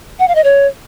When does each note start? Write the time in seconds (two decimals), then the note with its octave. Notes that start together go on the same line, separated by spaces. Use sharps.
0.19 F#5
0.28 F5
0.35 D#5
0.44 C#5